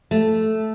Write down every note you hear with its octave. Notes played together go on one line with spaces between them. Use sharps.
A3